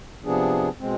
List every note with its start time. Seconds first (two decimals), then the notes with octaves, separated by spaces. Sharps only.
0.24 C3 F3 B3 D4 G#4
0.79 B2 G#3 C4